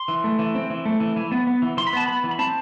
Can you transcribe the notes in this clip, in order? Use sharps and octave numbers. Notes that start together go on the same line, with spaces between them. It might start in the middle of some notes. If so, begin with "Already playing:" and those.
Already playing: C6
E3
A3
E3
C4
E3
A3
E3
E3
B3
B3
E3
E3 C6
B5
B3 A5
B3 B5
E3
B5
C4 A5